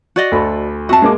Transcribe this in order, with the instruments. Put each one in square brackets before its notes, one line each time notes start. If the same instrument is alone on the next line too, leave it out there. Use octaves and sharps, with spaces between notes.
[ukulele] F#4 D5 D#5
[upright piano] D2 A4 B5
[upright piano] F2 E5 [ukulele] F#4 A5
[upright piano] G#3 A#3 D6